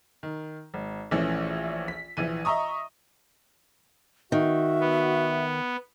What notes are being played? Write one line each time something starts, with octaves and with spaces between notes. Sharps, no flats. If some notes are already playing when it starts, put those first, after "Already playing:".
D#3
G#1
A#1 E3 A3 C#4
B6
A#1 E3 D#7
D#5 E5 A#5 C#6 D#6
D#3 F#4 E5
B3